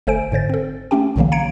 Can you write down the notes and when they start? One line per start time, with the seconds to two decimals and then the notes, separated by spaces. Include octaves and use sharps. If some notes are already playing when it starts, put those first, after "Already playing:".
0.07 G1 A3 A4 C5 G#5 D7
0.32 G#2 D3 C5 A6
0.49 C4 A4
0.91 A3 A#3 C#4 G4 G5
1.16 B1 A#2 D3 E3 F#3 A#3
1.32 F5 A#5 G#6 C#7 D7